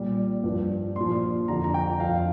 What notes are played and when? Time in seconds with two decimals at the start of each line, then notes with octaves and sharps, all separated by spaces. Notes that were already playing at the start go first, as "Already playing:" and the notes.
Already playing: A#2 G3
0.44 G2 F3
0.96 A#2 F3 C6
1.48 F2 D3 F3 A#5
1.64 A#5
1.74 G5
2.00 F2 F3 F5